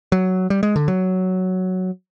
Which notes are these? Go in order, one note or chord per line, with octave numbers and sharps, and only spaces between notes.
F#3
G3
G#3
D3
F#3